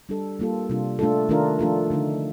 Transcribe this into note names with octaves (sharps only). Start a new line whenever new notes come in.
G3 D4 A4
G3 A#3 F4 A4
C3 G3 D4 F4
A3 D4 F4 A4
D#3 A3 D4 F4 A#4
F3 A3 D4 F4 A4
D3 A3 D#4